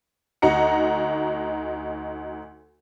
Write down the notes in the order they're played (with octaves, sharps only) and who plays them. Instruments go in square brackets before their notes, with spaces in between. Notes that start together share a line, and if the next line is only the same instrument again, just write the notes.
[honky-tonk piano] D2 D#4 F#4 A#5 C#7